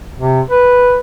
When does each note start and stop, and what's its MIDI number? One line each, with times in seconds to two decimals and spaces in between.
0.19 0.41 48
0.50 0.98 71